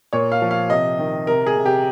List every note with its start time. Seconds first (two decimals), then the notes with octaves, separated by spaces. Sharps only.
0.13 A#2 C#5
0.32 F5
0.42 F3
0.51 F5
0.70 C3 D#5
0.99 D#3
1.27 C3 A#4
1.46 G#4
1.57 C3
1.66 G4